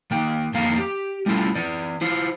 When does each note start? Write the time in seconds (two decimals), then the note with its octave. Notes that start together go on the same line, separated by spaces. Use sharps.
0.11 D#3 A#3 G5
0.54 F2 D3 D#3 A#3 F5 A#5
0.78 G4
1.26 G3 A3 C#4 E4 F4 A4
1.55 E3 D5
2.01 E4 F4 C5